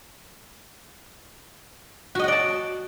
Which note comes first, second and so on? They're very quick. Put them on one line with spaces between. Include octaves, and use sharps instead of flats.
F#4 D#5 F#5 D5 A5